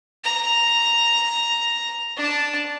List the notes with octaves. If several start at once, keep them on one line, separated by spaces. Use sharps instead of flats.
A#5
D4 A5